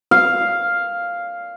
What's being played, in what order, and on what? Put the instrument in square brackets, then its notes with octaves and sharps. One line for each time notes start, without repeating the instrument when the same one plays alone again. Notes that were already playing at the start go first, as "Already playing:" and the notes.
[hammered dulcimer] F5